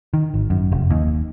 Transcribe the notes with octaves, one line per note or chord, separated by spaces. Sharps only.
D#3
G#1
F#2
F1
D#2